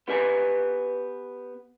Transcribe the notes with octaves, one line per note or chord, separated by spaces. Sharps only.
B3 G4 B4 G#5